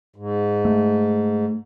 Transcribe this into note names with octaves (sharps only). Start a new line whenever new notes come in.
G#2
A3